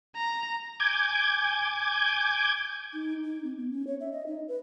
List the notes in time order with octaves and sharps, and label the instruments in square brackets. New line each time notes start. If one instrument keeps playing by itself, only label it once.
[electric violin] A#5
[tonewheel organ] G#5 D6 G6 G#6
[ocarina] D#4
D#4
C4
B3
C#4
C#5
E5
D#5
D#4
B4